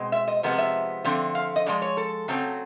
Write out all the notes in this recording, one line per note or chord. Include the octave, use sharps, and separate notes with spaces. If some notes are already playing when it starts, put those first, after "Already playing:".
Already playing: B2 G#3 C4
E5
D#5
C3 F3 G#3 B3
E5
D3 F3 A3 C4
F5
D#5
A2 F3 G#3 D5
C#5
A4
C#3 F#3 A3 C4